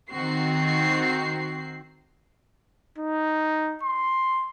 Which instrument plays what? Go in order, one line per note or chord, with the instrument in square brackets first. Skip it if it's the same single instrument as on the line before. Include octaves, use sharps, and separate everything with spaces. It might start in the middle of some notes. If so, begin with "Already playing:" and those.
[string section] D#3 C4 F#4 C7
[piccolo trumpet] D#4
C6